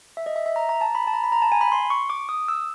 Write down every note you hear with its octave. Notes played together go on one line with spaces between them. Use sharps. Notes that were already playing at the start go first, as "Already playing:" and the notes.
E5
D#5
E5
E5
A#5
A#5
A5
B5
A5
A#5
B5
A#5
A5
G#5
B5
C6
C#6
D6
D#6
E6